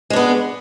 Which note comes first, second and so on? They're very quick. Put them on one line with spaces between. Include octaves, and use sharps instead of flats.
G#3 D4 B3